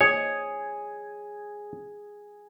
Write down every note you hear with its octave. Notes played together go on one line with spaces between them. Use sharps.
G#4 C#5